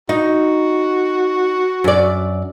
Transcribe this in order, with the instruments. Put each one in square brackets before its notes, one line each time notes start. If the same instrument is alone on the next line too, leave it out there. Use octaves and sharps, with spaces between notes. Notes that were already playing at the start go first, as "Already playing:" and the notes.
[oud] D#4 [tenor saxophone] F#4
[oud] F#2 D5